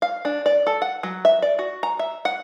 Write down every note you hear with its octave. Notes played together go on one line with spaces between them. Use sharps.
F5
D4
D5
A4
F#5
F#3
E5
D5
F#4
A#5
E5
F#5